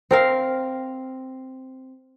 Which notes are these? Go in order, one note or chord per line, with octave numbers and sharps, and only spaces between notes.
C4 A#4 F5